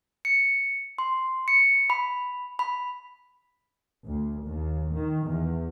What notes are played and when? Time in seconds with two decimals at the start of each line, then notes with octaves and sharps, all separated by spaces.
0.25 C#7
0.98 C6
1.48 C#7
1.90 B5
2.59 B5
4.05 D2
4.46 D#2
4.95 D#3
5.28 E2